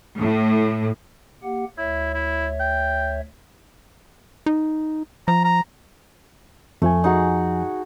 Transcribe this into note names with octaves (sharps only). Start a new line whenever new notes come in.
A2
A#3 G4 F#5
D2 E4 C#5 E5
E4
G5
D#4
F3 A#5
A#5
F2 F3 A3 G#5
D#4 F#4 G#4